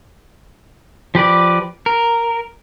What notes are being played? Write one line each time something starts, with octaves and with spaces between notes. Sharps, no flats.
F3 G4 B4 D5
A#4